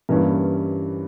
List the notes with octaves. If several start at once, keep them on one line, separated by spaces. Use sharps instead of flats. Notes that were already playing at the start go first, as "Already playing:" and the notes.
G2 E3 G3 A#3 C#4